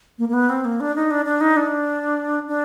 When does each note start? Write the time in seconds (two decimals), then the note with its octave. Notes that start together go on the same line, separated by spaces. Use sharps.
0.18 A#3
0.29 A#3
0.33 B3
0.49 C4
0.65 A#3
0.80 D4
0.96 D#4
1.11 D4
1.25 D4
1.40 D#4
1.56 D4
2.48 D4